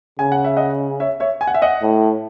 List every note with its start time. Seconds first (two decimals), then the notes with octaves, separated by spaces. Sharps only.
0.19 C#3 G#5
0.32 F#5
0.45 E5
0.56 D#5 F#5
1.00 C#5 E5
1.20 C#5 E5
1.41 G#5
1.47 F#5
1.54 E5
1.62 D#5 F#5
1.82 A2